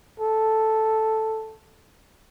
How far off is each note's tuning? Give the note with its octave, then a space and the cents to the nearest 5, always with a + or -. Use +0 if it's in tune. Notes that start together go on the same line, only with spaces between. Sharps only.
A4 +0